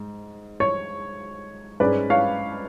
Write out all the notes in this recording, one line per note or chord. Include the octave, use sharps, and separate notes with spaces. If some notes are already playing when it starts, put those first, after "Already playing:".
Already playing: G#2
C#5
G#2 G#3 C#4 B4 D5
C#5 F5